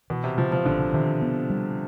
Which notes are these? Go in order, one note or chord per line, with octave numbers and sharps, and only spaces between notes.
B2 E3
C3
C#3 F3
F3
A1 D3
C3 D#3
B3
G3